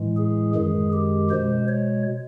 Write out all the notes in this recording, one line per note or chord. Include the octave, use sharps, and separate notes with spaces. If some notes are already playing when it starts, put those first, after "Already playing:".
Already playing: A2 E3 G#3
G#4
F#2 D#3 G#3 G#4
G4
B2 G#3 C5
C#5